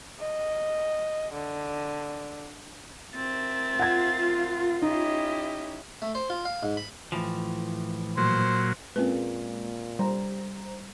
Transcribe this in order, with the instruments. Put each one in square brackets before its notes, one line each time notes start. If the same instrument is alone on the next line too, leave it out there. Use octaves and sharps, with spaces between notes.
[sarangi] D#5
D3
[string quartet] C4 A#4 E5 [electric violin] A6
[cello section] F4 [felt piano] F#5 G#6
[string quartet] C#4 E4 G4 [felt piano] D#4 [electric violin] D#5
[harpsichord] A3
C5
F4
F5
G#2
B5
[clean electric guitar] A2 E3 F3
[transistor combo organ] A#2 F#3 [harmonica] C5
[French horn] A#2 [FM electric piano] G#3 A#3 F4 [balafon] C4 C#4 B4
[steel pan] G3 [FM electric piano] C5 A#5